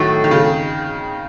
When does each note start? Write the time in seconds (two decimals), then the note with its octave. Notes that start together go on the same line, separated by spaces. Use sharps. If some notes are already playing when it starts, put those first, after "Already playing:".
Already playing: A2 D#3 F#3 A3
0.24 D#3
0.31 C#3